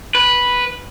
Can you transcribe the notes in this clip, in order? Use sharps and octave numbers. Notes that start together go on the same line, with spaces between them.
B4